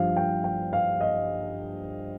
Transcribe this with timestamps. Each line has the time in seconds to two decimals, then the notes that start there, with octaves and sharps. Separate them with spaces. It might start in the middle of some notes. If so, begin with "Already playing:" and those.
Already playing: G2 F3 F5
0.16 G5
0.44 G5
0.73 F5
1.01 D#5